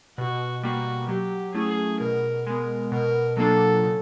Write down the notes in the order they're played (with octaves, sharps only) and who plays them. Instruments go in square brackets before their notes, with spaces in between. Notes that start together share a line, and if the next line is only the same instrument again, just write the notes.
[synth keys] B2 [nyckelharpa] F#4
[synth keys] G3 A#3 [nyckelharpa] F#4
[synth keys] F#3 [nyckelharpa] G4
[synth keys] A3 C#4 E4 [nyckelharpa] G#4
[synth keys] B2 [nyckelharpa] A#4
[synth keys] G#3 B3 [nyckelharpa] A#4
[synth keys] B2 [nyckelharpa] A#4
[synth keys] F#3 A#3 D4 F4 [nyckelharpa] A4
[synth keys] C#3